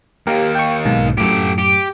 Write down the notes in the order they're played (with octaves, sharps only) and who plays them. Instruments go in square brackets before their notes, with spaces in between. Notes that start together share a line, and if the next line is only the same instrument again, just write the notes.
[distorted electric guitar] D#2 A#3 [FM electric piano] G4 A#4
[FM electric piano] G5 C#6
B1 G#2 B2
[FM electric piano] F#2 A2 [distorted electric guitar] G4 A4
[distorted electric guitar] G4